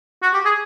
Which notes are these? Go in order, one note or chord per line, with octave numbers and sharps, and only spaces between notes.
F#4
G4
G#4